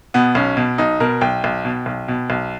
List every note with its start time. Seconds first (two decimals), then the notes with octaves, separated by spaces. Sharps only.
0.14 B2 B3
0.35 B1 C#4
0.57 B2
0.78 B1 D#4
1.00 B2 A#4
1.21 B1 G5
1.44 B1
1.65 B2
1.86 B1
2.08 B2
2.30 B1